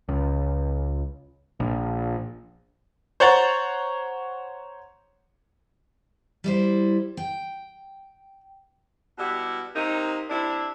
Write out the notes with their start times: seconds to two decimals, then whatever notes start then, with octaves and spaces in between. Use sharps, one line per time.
0.09 C#2
1.60 A#1
3.20 C5 C#5 F#5 A#5 A6
6.44 G3 E4 C5
7.17 G5
9.18 B2 G3 E4 G4 F#5
9.75 C3 A#3 D#4
10.30 C3 D4 E4